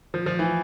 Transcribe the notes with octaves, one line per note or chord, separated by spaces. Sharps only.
F3
F3
E3